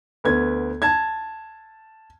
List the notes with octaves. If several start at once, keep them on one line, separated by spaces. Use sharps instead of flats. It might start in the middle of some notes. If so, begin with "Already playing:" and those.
D2 B3 G#6
A5 G#6